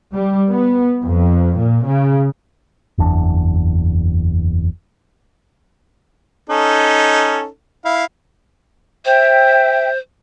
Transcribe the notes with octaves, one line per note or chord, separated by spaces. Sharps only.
G3
B3
F2
A#2
C#3
F#1 E2 D4
C#4 D#4 A4
E4 F5
C5 E5 G5